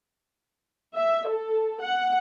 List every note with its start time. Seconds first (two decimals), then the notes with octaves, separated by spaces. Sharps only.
0.94 E5
1.28 A4
1.82 F#5